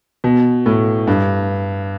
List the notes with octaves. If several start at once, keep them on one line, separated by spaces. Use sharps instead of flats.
B2
A2
G2